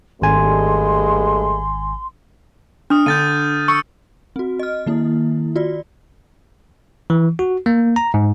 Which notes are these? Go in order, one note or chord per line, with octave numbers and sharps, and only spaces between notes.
G#1 G2 G#3 A3 G#5 C6
D4 D#6 F6
D3 G6 A6 D#7
C#6 E6 C#7
C4 F#4
D#5 F6
D#3 A#3 E4
F4 F#4 D5
E3
F#4
A#3
A#5
G#2